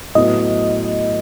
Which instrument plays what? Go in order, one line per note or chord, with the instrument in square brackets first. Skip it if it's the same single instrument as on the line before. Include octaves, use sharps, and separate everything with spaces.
[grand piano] A2 F#3 B3 [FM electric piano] D#5